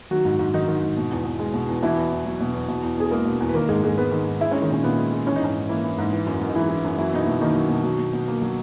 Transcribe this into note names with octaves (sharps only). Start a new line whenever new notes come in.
D#3 F#3 F#4
G#2
G#2
D#3 F#3 D#4
D#3
G#2
B2
E2
E2
G#3
B2
E2
B2 E3 E4
E2
E2
F#3
B2
E2
B2
E2
E2 G#4
G#3 A#3 A#4
B2
E2
B4
D#3 A#3 A#4
G#2 G#3 G#4
G#2 G#3 G#4
G#3 B3 B4
D#3
G#2
G#3 E4 E5
C#4 C#5
G#3
D#3 D#4
A#2 C#4
A#2 B3
G#3
G#3
E3 C#4
D#4
G#2 C#4
G#2
E3 A#3 E4
E3
G#2
E3
F#2
F#2
D#4
E3 G#3 E4
E3
F#2
E3 F#3 E4
B2 D#4
E3 E4
B2
D#3 A#3 D#4
F#3
B2
F#3
B2
B2
A#3
F#3